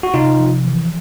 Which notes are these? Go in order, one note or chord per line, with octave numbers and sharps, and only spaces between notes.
F#4
C3 D#4 F4
F3
E3